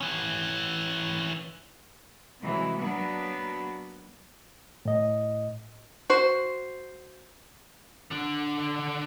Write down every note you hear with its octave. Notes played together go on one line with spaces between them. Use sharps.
E3 C#4
C3 E3 F#3 G#3
F#3 A#3 B3 D4
A2 D#5
F#4 C5
D3 D4